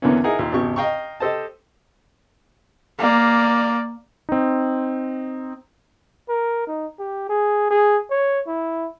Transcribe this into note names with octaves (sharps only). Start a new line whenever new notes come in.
E2 D3 E3 A#3 B3 C#4
D#4 E4 G#4 A#4 F#5
D#2 A#2
G#1 E2 C#3 G4 C#6
D#5 F5 G5 A#5 C#6
G4 A4 C5 D#5 A5
A#3 D5
C4 D#4
A#4
D#4
G4
G#4
G#4
C#5
E4